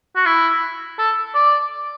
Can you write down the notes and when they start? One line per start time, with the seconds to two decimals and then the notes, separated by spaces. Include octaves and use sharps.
0.16 F#4
0.25 E4
0.98 A4
1.34 D5